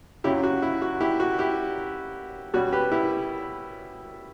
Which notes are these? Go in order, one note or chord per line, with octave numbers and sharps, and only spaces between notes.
F#2 C#3 F#3 E4 G4
F#4
E4
F#4
E4 G4
F#4
E4 G4
B2 G3 C#4 F#4
G4 B4
E4 G4